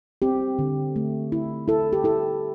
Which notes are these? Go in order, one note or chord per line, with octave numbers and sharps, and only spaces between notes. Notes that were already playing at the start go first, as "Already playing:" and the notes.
C4 G4
D3
A3
E4
E4 A4
G4
E4 A4